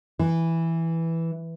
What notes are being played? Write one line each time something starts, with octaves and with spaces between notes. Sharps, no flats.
E3